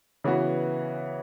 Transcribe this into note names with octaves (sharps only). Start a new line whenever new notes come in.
C#3 E3 B3 F#4